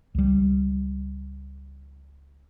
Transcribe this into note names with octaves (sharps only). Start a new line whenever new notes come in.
C#2 G3